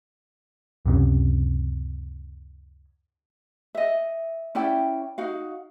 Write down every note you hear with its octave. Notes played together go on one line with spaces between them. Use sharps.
C#2 F#2 C3 C#4
D#5 E5
C#4 E4 D5 G5
D#4 F#4 F5